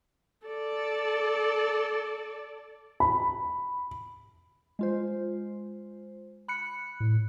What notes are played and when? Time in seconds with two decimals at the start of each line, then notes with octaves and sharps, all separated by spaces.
0.47 A4 D5
3.00 B5
4.79 G#3 F4 C5
6.48 B5 F#6 C#7
7.00 A2